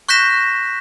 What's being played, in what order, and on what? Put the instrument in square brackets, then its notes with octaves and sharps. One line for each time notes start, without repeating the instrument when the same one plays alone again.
[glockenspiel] C#6 F#6 G6 A#6 B6 E7